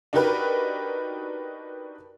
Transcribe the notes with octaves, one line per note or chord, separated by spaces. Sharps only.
D4 D#4 F#4 G4 A#4 B4